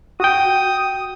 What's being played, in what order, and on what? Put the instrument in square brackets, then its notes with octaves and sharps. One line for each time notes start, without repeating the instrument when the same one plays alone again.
[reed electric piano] F#4 G5 [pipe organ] D#6